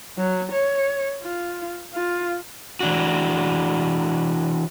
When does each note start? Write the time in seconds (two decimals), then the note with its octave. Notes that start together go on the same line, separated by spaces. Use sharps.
0.18 F#3
0.52 C#5
1.22 F4
1.94 F4
2.80 E3 D4 F#4